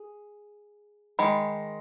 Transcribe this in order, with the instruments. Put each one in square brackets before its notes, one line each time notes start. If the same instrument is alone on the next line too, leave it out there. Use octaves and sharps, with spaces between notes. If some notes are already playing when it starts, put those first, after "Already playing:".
Already playing: [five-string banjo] G#4
[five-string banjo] D#3 G#3 [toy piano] B5